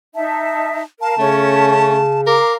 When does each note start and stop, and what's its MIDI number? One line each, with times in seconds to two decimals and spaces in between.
0.15 0.82 63
0.15 0.82 76
0.15 0.82 81
1.01 1.15 70
1.01 1.15 77
1.01 2.21 81
1.01 1.15 82
1.19 2.39 49
1.19 2.02 57
1.19 1.96 61
2.27 2.55 70
2.27 2.55 77
2.27 2.55 82
2.27 2.53 86